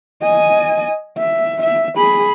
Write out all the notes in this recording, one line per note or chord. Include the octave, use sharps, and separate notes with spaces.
D#5 G#5
E5
E5
G#4 B5